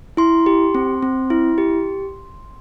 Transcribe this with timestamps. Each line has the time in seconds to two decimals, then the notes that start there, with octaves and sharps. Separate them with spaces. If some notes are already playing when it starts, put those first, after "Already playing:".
0.17 E4 C6
0.46 G4
0.75 C4
1.03 C4
1.30 E4
1.58 G4